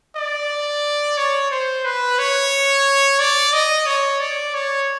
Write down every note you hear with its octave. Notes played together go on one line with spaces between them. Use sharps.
D5
C#5
C5
B4
C#5
D5
D#5
C#5
D5
C#5